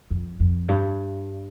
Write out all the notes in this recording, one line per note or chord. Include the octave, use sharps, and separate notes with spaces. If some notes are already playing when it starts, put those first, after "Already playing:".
F2
F2
G2